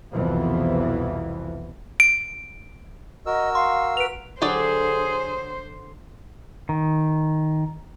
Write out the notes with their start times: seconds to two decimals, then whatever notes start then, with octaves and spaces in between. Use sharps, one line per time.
0.12 C2 F2 B2 E3 F3 B3
2.00 D7
3.26 F#4 A#4 D#5 E6
3.55 F5 C6
3.97 B4 D7 F7
4.42 D3 F#3 G4 G#4 C5 D5
6.69 D#3